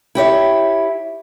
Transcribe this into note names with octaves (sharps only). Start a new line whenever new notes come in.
E4 G4 C#5 E5